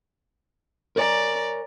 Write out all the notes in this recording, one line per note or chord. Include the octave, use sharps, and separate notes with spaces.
A#4 C#5 D5 G#5 A#5